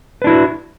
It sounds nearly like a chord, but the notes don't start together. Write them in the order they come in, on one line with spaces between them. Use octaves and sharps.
B4 D4 E4 F#4